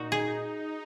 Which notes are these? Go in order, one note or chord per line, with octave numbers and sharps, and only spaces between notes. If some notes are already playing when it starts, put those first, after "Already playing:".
Already playing: A#2 D#4 F#4
G#4